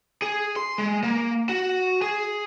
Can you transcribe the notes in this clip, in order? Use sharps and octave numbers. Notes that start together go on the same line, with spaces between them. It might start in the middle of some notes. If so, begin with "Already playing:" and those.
G#4
C6
G#3
A#3
F#4
G#4